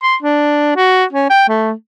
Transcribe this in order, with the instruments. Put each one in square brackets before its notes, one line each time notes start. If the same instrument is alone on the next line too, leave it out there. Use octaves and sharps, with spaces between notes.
[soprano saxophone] C6
D4
F#4
C#4
G5
A3